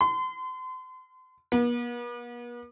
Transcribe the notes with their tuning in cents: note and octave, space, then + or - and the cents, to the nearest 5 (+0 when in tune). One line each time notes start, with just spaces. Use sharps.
C6 -35
B3 -45